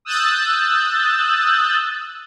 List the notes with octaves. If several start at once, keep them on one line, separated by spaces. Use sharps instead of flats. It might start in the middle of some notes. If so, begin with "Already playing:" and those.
D#6 E6 F#6 G6 A6